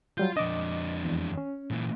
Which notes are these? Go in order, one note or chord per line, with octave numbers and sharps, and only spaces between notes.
F#3 G3 F4 G6
F2 D4 D#5 D6
E2
C#4
A#2 E3